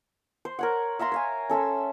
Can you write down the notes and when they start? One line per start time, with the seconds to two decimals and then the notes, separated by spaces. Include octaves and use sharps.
0.45 C5
0.59 A#4 C#5 F#5
0.99 E5 F5 A#5 C6
1.12 C#5 F5 G#5
1.50 C#4 A4 E5 C6